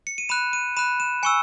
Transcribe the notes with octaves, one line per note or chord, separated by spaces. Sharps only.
C#7
D#7
B5 F#6 E7
D#7
B5 F#6 E7
E7
G#5 C#6 E6 C#7